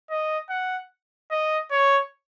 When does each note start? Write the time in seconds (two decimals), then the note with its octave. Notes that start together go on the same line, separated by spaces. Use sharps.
0.10 D#5
0.50 F#5
1.31 D#5
1.71 C#5